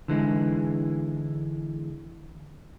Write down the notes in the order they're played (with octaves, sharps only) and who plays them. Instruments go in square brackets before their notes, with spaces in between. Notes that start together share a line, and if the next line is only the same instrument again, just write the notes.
[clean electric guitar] D3 E3 G#3